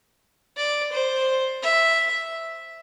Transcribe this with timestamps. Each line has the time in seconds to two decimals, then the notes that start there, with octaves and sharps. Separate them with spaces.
0.57 D5
0.92 C5
1.62 E5